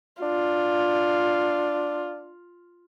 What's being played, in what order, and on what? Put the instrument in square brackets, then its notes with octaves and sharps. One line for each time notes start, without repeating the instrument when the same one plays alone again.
[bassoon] D4 [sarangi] F4